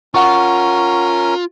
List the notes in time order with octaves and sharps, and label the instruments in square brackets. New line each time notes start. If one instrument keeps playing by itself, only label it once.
[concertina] C#4 A#4 [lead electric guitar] F4 [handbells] F#5 C#6